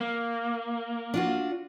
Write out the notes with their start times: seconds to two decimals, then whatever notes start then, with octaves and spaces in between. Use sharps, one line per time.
0.01 A#3
1.14 D4 F4 F#4